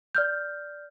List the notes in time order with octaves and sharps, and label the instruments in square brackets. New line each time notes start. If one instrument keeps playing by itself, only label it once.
[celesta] D5 F6 G6